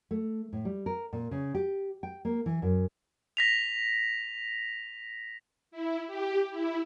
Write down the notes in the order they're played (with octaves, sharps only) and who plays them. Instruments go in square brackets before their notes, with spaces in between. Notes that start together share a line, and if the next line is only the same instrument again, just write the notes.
[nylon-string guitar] A3
A2
G3
A#4
A#2
C#3
G4
G5
A#3
E3
F#2
[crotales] A#6 B6 F7
[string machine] E4
G4
E4